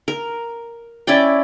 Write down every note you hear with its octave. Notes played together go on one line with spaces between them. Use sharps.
A#4
C#4 E4 D5 G5